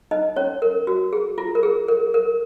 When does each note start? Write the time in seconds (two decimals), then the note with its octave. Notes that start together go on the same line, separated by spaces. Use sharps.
0.11 D#4 D#5
0.36 C#4 C#5
0.62 A#4
0.87 F#4
1.13 G#4
1.38 F4
1.55 A#4
1.63 G#4
1.88 A#4
2.14 A#4